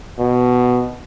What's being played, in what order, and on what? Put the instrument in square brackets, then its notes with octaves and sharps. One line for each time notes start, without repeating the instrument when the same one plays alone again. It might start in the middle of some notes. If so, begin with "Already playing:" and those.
[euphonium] B2